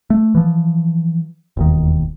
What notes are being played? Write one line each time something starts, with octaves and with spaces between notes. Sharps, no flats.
A3
E3 F3
E1 D#2 D#3